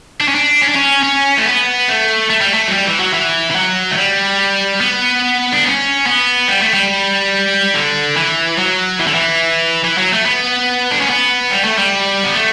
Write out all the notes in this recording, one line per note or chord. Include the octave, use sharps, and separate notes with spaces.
D4
C#4
D4
C#4
D4
C#4
C#4
A3
B3
A3
A3
G3
A3
F#3
G3
E3
F#3
E3
E3
F#3
A3
G3
B3
D4
C#4
B3
G3
A3
G3
D3
E3
F#3
E3
D3
E3
E3
F#3
A3
B3
D4
C#4
B3
G3
A3
G3
B3
A3